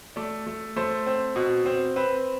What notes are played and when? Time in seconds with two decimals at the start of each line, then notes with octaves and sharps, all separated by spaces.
0.16 A3 D5
0.47 A3
0.76 A3 C5
1.06 C4
1.36 B2
1.66 C4
1.96 C4 B4